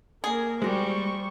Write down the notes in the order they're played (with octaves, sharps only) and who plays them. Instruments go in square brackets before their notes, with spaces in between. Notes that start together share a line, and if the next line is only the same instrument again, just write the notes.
[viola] A#3 A#4 [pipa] G#4
[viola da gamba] G3 [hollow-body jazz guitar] G#3 F#4 G4 [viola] C5 C#6